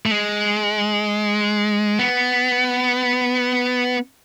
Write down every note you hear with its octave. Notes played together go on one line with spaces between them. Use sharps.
A3
G#3
B3